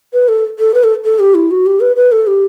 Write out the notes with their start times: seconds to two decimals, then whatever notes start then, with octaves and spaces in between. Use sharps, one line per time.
0.13 B4
0.28 A4
0.59 A4
0.74 B4
0.84 A4
1.05 A4
1.19 G4
1.35 E4
1.51 F#4
1.66 G4
1.80 B4
1.96 B4
2.12 A4
2.27 G4